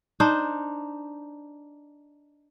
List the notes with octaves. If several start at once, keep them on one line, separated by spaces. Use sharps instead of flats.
D4 D#4 C5